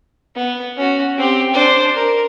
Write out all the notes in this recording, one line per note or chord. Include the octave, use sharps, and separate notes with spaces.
B3
C#4 F#4
C4 G4
D4 C5
A#4